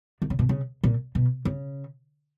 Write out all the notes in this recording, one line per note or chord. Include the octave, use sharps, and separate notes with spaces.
D#3
C#3
B2
C#3
A#2
B2
C#3